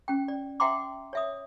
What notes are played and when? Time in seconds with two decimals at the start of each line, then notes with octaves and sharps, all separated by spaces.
0.08 C#4 G5
0.28 D5
0.60 E5 F#5 G5 A#5 C6 D6
1.13 C#5 E5 D#6